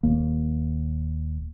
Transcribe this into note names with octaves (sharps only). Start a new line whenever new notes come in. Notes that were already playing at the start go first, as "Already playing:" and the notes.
D#1 D#2 A#3